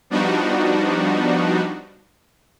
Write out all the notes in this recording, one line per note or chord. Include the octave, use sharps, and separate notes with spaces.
F3 G3 B3 D4 D#4 F#4